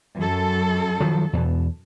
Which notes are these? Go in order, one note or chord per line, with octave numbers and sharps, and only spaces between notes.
F#2 A4
D#3 F3 F#3
E2 B2